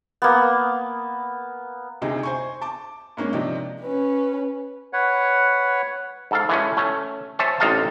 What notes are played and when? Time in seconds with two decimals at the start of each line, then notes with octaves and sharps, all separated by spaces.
0.22 A#3 B3
2.02 D2 C3 D#4 G#4
2.23 C5 G#5 C#6
2.61 A5 D6
3.17 G#2 A#3 C#4
3.33 C3 F3 D4 D#4
3.81 C#4 B4
4.93 B4 C#5 F#5
6.31 G#2 A4 F5
6.49 E3 G#3 A3 C#4
6.77 A3 C#4
7.39 C5 C#5 E5 G#5 A5
7.60 A1 C3 D#4 A4 F5 A5